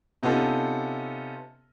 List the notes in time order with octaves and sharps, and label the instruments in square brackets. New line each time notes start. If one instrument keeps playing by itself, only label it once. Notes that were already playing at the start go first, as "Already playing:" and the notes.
[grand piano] C3 B3 C#4 D#4 F4 A4